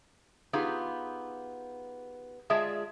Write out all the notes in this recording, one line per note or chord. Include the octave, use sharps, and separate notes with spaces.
B3 D#4 F4 G4 G#4
G#3 F4 G#4 D5 E5 A5